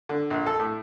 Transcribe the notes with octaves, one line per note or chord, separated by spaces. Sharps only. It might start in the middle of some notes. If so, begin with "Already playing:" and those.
D3
A#1
A4
A2